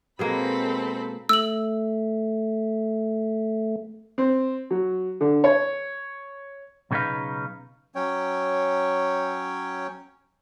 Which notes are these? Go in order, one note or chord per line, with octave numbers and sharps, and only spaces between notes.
B2 G#3 A#3 C4 A4 B5
A3 E6 F#7
C4
F#3
D3
C#5
B1 C#3 B3 D#4 B4 F5
F#3 C#4 C#5 G5